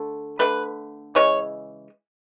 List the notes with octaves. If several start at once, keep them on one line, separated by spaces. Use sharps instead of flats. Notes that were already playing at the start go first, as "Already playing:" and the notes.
Already playing: D3 A3
D3 A3 B4
C#3 E3 G#3 C#5